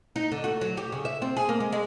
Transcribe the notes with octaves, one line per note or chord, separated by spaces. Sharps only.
D#4
D3
F#4
F#3
G4
C#3
E5
C4
G#4
A#3
G#3
G#3